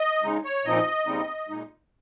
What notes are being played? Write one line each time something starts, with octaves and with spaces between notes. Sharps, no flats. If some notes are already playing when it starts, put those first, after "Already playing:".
Already playing: D#5
C#3 G#3 D#4
C#5
A#2 F3 C4 D#4 D#5
D#2 C#3 G3 C4 D#4
A#2 G#3 D#4